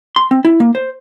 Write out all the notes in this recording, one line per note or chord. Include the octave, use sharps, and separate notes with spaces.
C6
C4
E4
A#3
C5